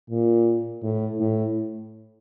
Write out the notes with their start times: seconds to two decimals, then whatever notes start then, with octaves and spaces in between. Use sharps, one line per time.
0.10 A#2
0.83 A2
1.20 A2